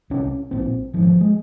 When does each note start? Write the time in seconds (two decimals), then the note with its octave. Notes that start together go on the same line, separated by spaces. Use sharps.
0.10 C2 C3 C#4
0.51 A#1 A#2 C4
0.93 G#1 G2 F3
1.02 E3
1.07 F3
1.21 G#3